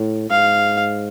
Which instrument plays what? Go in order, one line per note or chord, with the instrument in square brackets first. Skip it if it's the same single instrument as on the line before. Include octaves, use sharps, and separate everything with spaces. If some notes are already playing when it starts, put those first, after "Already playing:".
Already playing: [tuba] A2
[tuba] G#2 [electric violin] F5